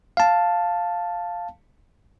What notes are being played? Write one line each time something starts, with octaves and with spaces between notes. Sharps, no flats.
F5 A5